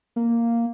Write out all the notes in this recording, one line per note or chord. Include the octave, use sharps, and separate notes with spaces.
A#3